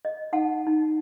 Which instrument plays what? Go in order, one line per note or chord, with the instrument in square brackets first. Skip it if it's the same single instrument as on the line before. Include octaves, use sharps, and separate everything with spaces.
[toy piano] D#5
D#4 F#5 A5
D#4